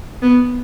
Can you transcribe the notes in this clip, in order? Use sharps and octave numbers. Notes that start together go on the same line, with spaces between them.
B3